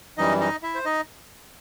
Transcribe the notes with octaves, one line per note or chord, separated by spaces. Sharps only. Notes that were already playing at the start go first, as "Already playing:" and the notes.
F#2 E3 G3 D#4 D#5
D#4 D#5
E4 E5
C5
D#4 D#5